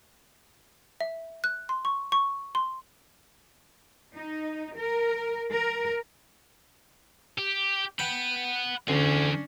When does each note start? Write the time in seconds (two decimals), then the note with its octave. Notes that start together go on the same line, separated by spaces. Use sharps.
1.00 E5
1.44 F#6
1.69 C6
1.85 C#6
2.12 C#6
2.55 C6
4.14 D#4
4.76 A#4
5.52 A#4
7.38 G4
7.99 F#5 G5 B5
8.88 D2 E3 C#4 D4 G#4